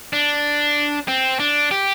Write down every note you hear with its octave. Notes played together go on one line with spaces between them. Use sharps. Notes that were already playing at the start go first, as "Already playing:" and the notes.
D4
C4
D4
G4